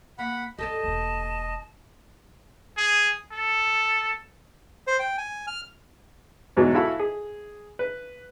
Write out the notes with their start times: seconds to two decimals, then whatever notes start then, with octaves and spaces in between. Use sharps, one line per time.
0.19 A#3 F#5 B5
0.59 G2 C#4 G4 A4 D5 D#5 A5
0.83 E1 A#3
2.77 G#4
3.32 A4
4.87 C5
4.99 G5
5.18 G#5
5.47 F6
6.57 E2 G#2 B2 F#3
6.75 E4 F#4 A4 F5 G#5 B5
6.99 G#4
7.79 B4